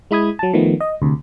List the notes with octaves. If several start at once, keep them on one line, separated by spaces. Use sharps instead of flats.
G#3 E4 B5 D#6 G#6
F#3 A5
D#3 F3 A3 B3
D#5
D2 C3